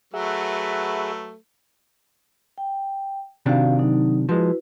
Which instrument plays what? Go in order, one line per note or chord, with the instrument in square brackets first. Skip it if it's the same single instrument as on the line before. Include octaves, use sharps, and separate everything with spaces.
[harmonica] F#3 A3 B4 [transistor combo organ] G#4 E5 F#5
[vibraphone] G5
[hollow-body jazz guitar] C3 D#3 D4 [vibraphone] F#4 F5
[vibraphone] F#3 D#4
[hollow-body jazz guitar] F3 G#3 [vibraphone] E4 F#4 B4